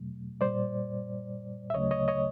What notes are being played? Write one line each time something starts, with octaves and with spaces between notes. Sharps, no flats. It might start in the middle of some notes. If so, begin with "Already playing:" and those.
Already playing: E2 B2 F#3 A3
A#2 G3 C5 D5
E5
D2 C#3 F#3 A3 C#5 D#5
C#5 D#5
C#5 D#5